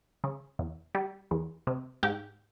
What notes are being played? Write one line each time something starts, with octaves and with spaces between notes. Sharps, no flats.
C#3
E2
G3
E2
C3
G#2 G4